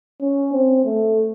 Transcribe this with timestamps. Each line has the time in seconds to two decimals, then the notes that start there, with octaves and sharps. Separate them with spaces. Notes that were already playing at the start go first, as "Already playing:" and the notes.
0.21 C#4
0.53 C4
0.85 A3